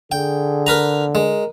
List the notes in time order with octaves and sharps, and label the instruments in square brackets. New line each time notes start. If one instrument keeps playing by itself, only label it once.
[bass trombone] D3 [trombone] G#4 [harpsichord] G5
[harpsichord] A#4 B4 A#5
[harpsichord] G#3 [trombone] A#4